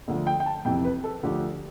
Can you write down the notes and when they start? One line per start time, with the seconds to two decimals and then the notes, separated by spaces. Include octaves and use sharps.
0.08 D2 D3 F3
0.27 G5
0.40 G5
0.46 A5
0.65 F2 C3 E3 G5
0.85 B4
1.04 A4
1.23 D2 D3 F3 G4